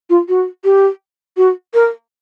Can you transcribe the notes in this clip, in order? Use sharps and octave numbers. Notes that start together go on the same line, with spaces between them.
F4
F#4
G4
F#4
A#4